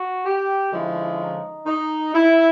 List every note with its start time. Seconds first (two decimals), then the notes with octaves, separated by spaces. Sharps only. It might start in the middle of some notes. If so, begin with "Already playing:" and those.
Already playing: F#4
0.25 G4
0.72 D3 F3 G#3 C#4 E4
1.19 D#4
1.67 D#4
2.14 E4